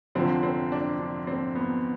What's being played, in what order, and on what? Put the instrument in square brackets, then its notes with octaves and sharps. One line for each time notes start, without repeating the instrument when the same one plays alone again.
[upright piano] F1 F2 D3 F3 C4
C4
D4
D4
C4
B3